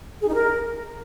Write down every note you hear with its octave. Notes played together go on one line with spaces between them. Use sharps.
G#4
D#4
A#4